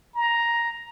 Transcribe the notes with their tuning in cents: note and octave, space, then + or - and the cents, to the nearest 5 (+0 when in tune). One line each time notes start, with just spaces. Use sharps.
A#5 +5